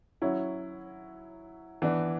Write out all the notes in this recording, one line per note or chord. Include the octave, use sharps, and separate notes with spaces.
F#3 C#4 E4
E3 B3 D4